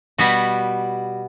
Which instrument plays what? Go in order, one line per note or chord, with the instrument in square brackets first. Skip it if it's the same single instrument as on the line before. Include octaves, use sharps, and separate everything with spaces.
[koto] B2 G3 B3 F#4